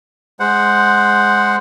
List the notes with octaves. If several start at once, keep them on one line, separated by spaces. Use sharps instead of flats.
G#3 C5 F#5